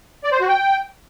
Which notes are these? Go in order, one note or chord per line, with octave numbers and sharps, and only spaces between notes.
D5
C5
F#4
G5